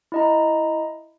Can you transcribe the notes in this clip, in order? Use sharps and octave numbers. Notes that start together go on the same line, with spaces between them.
E4 D#5 A#5